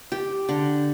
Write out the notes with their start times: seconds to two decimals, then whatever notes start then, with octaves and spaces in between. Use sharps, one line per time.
0.12 G4
0.49 D3